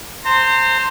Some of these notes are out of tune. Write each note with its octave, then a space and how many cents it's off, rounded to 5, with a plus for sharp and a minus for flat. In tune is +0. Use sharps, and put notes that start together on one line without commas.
C5 +0 A#5 -35